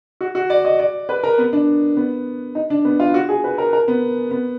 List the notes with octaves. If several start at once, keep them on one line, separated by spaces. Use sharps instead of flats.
F#4
F#4
D5
D#5
D5
B4
A#4
B3
D4
B3
D#4
D4
B3
F4
F#4
G#4
B4
A#4
A#4
B3
B3